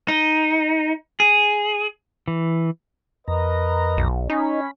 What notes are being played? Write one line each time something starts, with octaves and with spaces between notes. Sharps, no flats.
D#4
G#4
E3
F2 A#4 B4 D#5 A#5
B1
C#4 D#4 B5